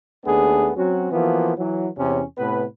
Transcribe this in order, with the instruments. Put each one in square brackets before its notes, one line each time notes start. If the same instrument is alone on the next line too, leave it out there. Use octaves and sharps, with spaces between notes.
[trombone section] D#2 A3 B3 D4 G#4
F#3 C4 C#4 F#4
E3 F3 A#3 B3 F#4
E3 F#3
E2 C3 C#4
A2 C3 B3 B4